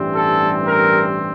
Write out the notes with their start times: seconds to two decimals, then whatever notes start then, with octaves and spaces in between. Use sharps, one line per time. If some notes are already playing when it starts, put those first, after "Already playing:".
Already playing: A1 G2 E3 G3 C4
0.16 A4
0.68 A#4